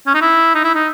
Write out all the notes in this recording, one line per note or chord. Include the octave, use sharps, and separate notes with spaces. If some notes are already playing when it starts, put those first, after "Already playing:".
C#4
D#4
E4
D#4
E4
D#4